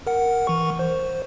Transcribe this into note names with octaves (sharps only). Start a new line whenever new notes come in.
A#4 F#5
E3 C#6
C5